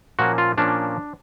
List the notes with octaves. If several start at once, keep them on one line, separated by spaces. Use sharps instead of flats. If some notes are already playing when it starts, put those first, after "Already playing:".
A#2 F3 A#3 C#4 F#4
F4
A#2 F3 A#3 C#4 D4